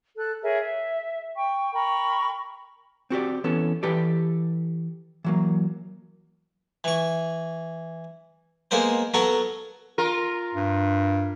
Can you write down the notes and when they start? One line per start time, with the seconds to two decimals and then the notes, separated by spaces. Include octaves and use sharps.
0.16 A4 F#6
0.42 G#4 A#4 C#5 E5
0.61 E5
1.35 G5 C#6
1.73 A#4 G5 B5 C#6
3.10 C4 F#4 G4 D5
3.44 E3 B3 C#4 A4
3.83 E3 G4 A4 B4 D5
5.24 E3 F#3 A#3
6.84 E3 C#6
8.71 G#3 A#3 B3 A#4 C5
9.14 F#3 B3 F#4 A4 A#4
9.98 F4 A#4
10.54 G2